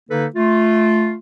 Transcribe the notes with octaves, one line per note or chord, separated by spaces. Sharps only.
D3 A#3 D#4 A4 B4
A3 F4